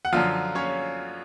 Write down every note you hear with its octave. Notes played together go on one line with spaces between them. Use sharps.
F#5
F#2 D3 F3 F4 F5
C#4 C#5